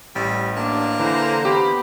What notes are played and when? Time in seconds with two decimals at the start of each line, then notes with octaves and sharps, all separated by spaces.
0.15 A1 G3
0.56 A#3 D4
1.00 D3 E3 C5 A#5
1.45 B3 G4